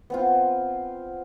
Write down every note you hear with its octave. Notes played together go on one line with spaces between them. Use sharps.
B3 C4 F4